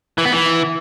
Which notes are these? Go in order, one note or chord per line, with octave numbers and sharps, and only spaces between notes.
E3
B3
E3